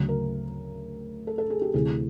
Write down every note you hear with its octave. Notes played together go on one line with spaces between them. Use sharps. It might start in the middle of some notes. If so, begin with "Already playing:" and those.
Already playing: D2 C#3 F#3
A#4
A4
A4
G#4
G4
D2 C3 E3 G#4